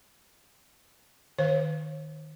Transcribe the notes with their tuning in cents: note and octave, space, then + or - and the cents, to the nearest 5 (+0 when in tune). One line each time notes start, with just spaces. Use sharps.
D#3 -10 C#5 -40 F5 +0